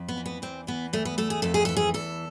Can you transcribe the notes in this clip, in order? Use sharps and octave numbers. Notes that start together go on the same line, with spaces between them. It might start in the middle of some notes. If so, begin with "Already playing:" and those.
Already playing: F2
B3
E3
B3
E2 C4
E3 B3
E2 A3
B3
A3 A4
G#4
F2 A4
G#4
E3 A4
G#4
E2 A4